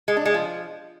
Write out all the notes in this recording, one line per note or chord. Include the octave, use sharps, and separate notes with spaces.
G#3
D4
G#3
F3